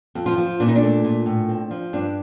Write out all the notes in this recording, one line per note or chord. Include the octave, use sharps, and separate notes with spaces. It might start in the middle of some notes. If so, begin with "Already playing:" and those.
F2
F3 F4
F3
A#2 D4
D#4
D4
A3
A#2
A2
C4
F3
G2 D4